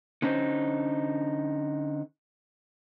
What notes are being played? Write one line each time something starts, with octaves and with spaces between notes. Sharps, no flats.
D3 C#4 D#4 C5